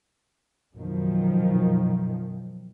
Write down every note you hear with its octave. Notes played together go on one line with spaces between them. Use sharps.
F#2 B2 D#3 F3